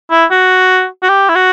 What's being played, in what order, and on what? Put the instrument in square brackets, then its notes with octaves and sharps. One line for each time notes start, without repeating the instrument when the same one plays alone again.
[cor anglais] E4
F#4
F#4
G4
E4
F#4